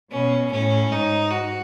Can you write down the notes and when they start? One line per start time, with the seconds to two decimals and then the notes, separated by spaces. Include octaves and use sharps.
0.12 B2 C#4
0.51 A2 C#4
0.91 G#2 D#4
1.31 F#4